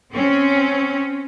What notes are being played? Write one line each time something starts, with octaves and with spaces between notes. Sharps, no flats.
C4 C#4